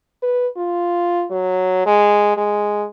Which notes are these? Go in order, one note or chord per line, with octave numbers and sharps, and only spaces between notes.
B4
F4
F#3
G#3
G#3